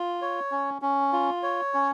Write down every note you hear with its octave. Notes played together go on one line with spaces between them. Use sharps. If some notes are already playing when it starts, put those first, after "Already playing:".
Already playing: F4
C#5
C#4
C#4
F4
C#5
C#4